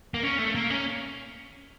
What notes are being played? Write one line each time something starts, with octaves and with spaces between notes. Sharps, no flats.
A#3
C#4
A3
A#3
C#4